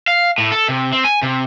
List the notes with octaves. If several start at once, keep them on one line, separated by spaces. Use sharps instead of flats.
F5
A2
A4
C3
C4
G#5
C3